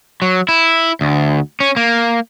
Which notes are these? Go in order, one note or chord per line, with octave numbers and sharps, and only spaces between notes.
F#3
E4
D2
C#4
A#3